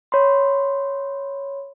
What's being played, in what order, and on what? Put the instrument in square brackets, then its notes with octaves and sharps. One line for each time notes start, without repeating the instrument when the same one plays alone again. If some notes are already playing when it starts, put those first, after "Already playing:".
[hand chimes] C#5 B5 C6